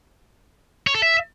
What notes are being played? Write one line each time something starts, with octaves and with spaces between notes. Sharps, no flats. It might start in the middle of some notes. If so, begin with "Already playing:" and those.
C#5
A4
E5